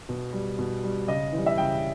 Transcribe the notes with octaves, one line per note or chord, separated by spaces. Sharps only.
B2
G3
B2
G3
C#3 D#5
E3 G3
E5
C#3 G5